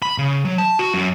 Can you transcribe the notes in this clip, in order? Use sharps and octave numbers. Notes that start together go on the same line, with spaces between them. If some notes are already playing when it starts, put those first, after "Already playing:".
B5
C#3
F#3
A5
F#4
F#2